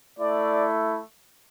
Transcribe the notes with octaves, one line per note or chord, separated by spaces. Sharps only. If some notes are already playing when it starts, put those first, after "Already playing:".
A3 E4 D5